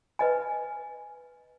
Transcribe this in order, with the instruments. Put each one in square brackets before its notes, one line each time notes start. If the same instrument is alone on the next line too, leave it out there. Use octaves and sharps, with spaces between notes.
[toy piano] B4 D#5 G#5